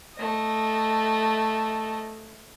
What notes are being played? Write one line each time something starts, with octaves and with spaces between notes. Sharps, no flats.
A3 D#5